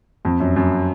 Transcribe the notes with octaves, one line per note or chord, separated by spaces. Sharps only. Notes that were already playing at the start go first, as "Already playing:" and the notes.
F2
F#2
F#2